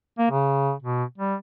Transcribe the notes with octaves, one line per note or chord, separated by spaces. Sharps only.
A#3
C#3
B2
G3